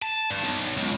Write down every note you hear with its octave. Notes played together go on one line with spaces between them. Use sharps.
A5
G2
B1
C#2